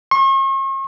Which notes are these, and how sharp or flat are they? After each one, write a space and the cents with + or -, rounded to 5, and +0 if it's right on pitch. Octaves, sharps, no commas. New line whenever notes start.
C#6 -45